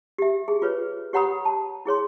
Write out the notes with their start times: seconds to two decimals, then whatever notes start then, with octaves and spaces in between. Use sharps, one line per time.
0.18 G4 E5
0.48 G#4
0.62 F4 B4 C#5
1.13 G4 C#5 F#5 A#5 B5 D#6
1.45 A5
1.85 E4 G#4 C#5 C6